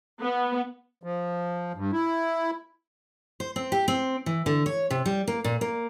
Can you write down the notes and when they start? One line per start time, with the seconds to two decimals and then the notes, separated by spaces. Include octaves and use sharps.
0.21 B3
1.03 F3
1.75 G2
1.93 E4
3.40 C5
3.56 C4
3.72 G4
3.88 C4
4.26 E3
4.46 D3
4.66 C#5
4.90 C3
5.06 G3
5.27 A#3
5.44 A#2
5.61 A#3